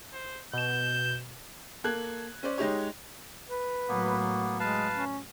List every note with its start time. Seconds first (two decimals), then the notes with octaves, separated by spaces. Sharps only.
0.13 C5
0.53 B2 G6 E7
1.84 A#3 A4 F#6 G#6 F#7
2.43 C#4 C5 D5
2.58 G#3 D#4 G4 C#5
3.49 B4
3.89 A2 F#3 A#3 B3
4.60 G#3 B4 F5 A5
4.93 C#4